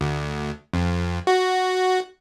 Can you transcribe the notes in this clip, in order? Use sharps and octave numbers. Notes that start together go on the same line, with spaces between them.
D2
F2
F#4